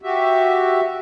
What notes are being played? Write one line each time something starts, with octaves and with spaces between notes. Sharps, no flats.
F#4 G4 E5